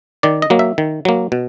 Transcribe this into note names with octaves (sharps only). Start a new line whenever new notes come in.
D#3 D5
D#5
F#3 A#3
E5
D#3
F#3 A#3
B2